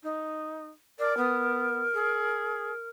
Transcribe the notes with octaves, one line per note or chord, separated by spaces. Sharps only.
D#4
A#4 D5
B3
G#4